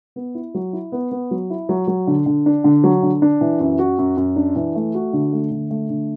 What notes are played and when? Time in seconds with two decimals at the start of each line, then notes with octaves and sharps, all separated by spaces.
0.16 B3
0.35 E4
0.54 F#3
0.73 E4
0.92 B3
1.12 B3
1.31 F#3
1.50 E4
1.69 F#3
1.87 F#3
2.07 D3
2.26 D3
2.46 D4
2.64 D3
2.84 F#3
3.03 D3
3.22 D4
3.41 E3
3.60 F#2
3.79 F#4
3.99 F#2
4.17 F#2
4.36 D4
4.56 E3
4.75 A3
4.95 F#4
5.13 D3
5.33 A3
5.51 D3
5.71 A3
5.90 D3